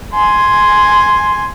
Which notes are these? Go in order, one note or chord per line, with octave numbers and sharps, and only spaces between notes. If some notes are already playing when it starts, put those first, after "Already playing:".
G#5 C6